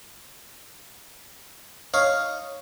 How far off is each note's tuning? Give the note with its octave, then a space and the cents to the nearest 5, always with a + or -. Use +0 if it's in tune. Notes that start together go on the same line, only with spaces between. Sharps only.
D#4 +0 C#5 +0 F5 -5